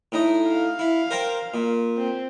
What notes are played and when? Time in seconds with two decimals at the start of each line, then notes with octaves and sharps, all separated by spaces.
0.12 A2 D#4
0.47 F5
0.79 E4
1.11 A#4 C5 G5
1.54 A#2
1.98 C4